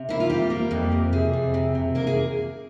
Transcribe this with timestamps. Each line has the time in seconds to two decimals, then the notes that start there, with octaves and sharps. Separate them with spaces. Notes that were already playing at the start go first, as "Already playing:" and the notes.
Already playing: C3
0.09 A#3 E4
0.20 F4
0.30 G3 G4
0.50 A#3
0.71 F2
0.92 C3
1.13 C3 G#4
1.33 F2
1.54 C3
1.75 C3
1.95 A#3 A#4
2.07 G#4